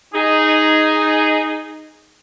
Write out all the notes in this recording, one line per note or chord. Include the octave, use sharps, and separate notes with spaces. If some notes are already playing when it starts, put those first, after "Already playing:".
D#4 G#4